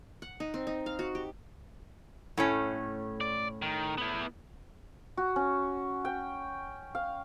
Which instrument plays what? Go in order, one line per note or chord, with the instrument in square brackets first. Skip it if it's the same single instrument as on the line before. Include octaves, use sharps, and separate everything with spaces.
[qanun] F#5
D#4
C4
D#4
F5
F#4
G4
[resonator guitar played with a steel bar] A2 A3 C#4
[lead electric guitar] D5
D#3
B3 E4
[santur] F#4
C#4
G5
F5